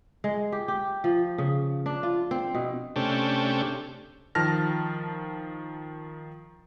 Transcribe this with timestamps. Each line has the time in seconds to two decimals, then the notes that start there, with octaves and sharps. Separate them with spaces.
0.24 G#3
0.52 G4
0.68 G4
1.04 F3
1.38 C#3
1.86 D4
2.03 F4
2.31 C4
2.54 B2
2.96 C3 A3 C#4 D4 G4
4.35 D#3 F3 A5 F6 A#6